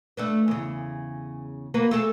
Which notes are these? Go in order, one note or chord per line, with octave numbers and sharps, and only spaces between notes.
A3 D4 B4
E2 C#3
A#3 F#4 B4
A3 G#4 A4